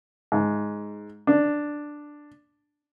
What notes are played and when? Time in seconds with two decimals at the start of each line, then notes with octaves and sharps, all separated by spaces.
0.32 G#2
1.27 D4